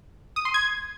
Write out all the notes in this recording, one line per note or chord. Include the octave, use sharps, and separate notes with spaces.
D#6
C6
G#6